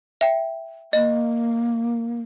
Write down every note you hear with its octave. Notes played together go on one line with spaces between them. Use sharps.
E5 G5
A#3 D#5